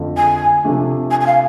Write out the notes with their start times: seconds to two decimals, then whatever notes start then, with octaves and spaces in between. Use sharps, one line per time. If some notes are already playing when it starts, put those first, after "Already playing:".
Already playing: F2 D3 F3 A3
0.17 G#5
0.64 C3 F3 A3 D4
1.11 G#5
1.21 G#5
1.26 F5